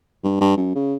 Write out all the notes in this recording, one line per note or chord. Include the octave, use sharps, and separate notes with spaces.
G2
G2
F#2
C#3